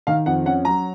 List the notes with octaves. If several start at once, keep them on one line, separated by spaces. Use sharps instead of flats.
D#3 F5
F2 F#5
C#4 F#5
F#3 A#5